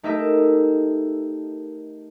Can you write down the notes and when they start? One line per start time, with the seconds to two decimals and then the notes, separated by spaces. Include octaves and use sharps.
0.03 A3 D#4 G4 A#4 D#5 E5